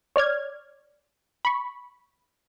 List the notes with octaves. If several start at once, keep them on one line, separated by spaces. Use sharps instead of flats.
C#5 D5 F6 G#6
B5 C#6